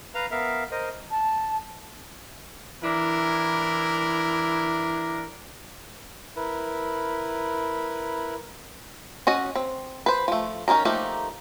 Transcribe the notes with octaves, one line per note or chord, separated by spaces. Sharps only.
B4 F5 A#5
B3 A#4 E5 F5
A#4 C5 D#5
A5
E3 D4 E4 A#4
E4 A#4 B4
C#4 F#4 D#5
C4
B4 C5
F3 A3
C#4 D#4 G#4 A#4
F3 A3 A#3 D#4 G4